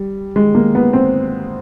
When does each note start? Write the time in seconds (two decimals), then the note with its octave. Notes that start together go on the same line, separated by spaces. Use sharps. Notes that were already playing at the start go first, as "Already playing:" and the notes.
Already playing: G3
0.36 G#3
0.54 A#3
0.75 B3
0.93 C4